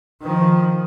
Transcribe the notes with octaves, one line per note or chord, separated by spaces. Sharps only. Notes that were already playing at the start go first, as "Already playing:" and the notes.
D#3 F3